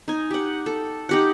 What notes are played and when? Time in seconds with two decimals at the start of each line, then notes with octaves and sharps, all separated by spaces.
0.08 D#4 G#5
0.31 G4 F#5
0.66 A4
1.09 D#4 G4 F#5